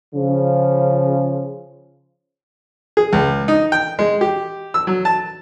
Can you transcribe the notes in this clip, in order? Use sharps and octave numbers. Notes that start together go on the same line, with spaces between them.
C#3 F3
G#4
C#2
D#4
G5
G#3
G4
E6
F#3
A5